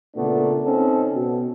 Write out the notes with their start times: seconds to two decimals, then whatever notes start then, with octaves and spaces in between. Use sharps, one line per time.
0.16 A#2 C#3 A3 B3 D4
0.63 C4 C#4 D#4 A4
1.14 B2